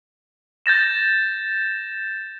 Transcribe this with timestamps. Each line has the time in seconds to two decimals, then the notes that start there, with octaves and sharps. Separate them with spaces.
0.66 G6 A6 A#6 E7